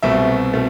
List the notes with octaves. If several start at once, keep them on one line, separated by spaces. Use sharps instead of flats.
C2 B2 A3 C4 E5
B2 A3 C4